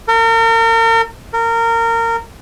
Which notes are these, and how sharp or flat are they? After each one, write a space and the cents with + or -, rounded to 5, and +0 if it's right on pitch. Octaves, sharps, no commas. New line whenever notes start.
A#4 -40
A#4 -25